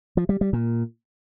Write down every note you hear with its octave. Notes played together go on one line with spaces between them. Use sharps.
F3
G3
G3
A#2